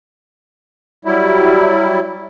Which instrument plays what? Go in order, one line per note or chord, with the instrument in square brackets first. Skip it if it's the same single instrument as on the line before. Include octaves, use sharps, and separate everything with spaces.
[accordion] F#3 G3 E4